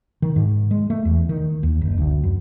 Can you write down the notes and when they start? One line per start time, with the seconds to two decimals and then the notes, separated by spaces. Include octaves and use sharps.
0.22 D#3
0.36 G#2
0.71 G#3
0.90 A3
1.05 E2
1.29 D#3
1.63 D#2
1.81 F#1
1.98 D2
2.23 F#2